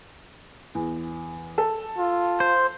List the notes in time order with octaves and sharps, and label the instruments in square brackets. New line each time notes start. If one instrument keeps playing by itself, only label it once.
[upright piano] E2
A4
[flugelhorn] F4
[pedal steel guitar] C5